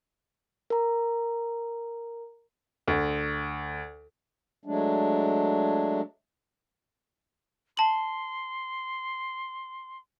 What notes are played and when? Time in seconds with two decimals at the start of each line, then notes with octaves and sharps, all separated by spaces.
0.70 A#4 A#5
2.88 D2
4.65 F#3 G#3 A3 D4
7.77 A5 C6 F#7